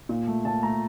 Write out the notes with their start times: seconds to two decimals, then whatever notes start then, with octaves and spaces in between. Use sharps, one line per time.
0.09 A#2
0.27 A3
0.45 A#2 A5
0.63 A3 A#5